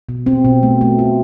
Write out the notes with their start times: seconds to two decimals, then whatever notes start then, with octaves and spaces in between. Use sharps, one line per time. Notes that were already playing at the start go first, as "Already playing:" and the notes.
0.09 B2
0.26 C4
0.45 B2
0.63 A3
0.81 A3
0.99 F4